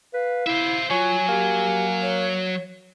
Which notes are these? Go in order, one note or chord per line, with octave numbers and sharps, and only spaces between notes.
B4 F5
E4 C5 E5
F#3 F4 C#5 G#5
A#3 G4
C#5